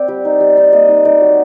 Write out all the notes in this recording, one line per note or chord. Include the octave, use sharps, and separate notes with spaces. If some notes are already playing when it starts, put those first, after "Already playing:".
Already playing: C4 D5
G3
D#4
G3
D#4
A#3 D#5
D#4
D#4 D5
F#3